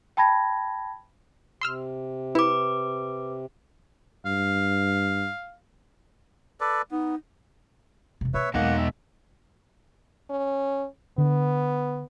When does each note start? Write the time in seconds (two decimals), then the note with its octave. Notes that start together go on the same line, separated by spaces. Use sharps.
0.17 G5 A5 B5 G#6 A#6
1.61 C3 C6 E6 F6
2.35 E4 B4 D6
4.25 G2 F5
6.60 A4 B4 D5
6.91 B3 D#4
8.21 E1 C3
8.34 A#3 B4 C#5 E5
8.54 E2 B2 G#3 A#3 D#4 F#5
8.77 E5
10.30 C#4
11.18 D3 B3